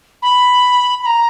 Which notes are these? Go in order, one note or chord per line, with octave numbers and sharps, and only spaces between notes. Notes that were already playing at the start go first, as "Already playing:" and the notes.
B5
B5
A#5